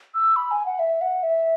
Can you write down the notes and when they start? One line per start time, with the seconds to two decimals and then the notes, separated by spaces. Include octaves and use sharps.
0.14 E6
0.36 B5
0.51 G#5
0.66 F#5
0.79 E5
1.01 F#5
1.23 E5